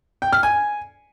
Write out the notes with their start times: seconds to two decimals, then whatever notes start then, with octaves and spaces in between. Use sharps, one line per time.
0.22 G5
0.33 F6
0.43 G#5